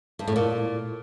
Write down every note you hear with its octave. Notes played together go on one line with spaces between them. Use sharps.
G2
A2
A#2